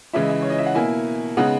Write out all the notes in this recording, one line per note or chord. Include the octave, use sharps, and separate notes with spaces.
C#3 E3 G#3 C#4 E4 E5
D#5
E5
C#5
D#5
E5
F#5
B2 A#3 E4 G#5
C#3 G#3 B3 D#4 F#5